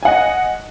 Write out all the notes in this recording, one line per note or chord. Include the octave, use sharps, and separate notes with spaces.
D#5 F#5 G#5